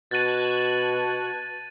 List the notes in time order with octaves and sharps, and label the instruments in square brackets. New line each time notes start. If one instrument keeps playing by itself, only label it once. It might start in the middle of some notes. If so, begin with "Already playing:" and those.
[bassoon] B2 [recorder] F#4 [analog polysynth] A5 F#6 G#6 [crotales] A6 D#7